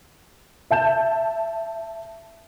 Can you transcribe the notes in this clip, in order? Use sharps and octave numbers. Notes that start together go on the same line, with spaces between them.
E5 A5 G6 E7